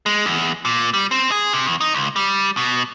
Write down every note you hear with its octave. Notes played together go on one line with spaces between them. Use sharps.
G#3
E2
A#2
G3
C4
G#4
C3
E2
D#4
C#2
G3
B2